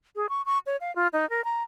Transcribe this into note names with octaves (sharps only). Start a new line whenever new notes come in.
G#4
C#6
C#6
C#5
F5
F4
D#4
A#4
A#5